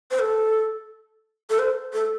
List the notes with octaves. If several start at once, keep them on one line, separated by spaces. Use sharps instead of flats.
C5
A4
A4
C5
A4